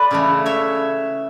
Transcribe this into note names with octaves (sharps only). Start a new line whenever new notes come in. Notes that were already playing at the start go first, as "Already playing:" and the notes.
Already playing: A4 B4 D5
C#3 E3 A3
C#5 E5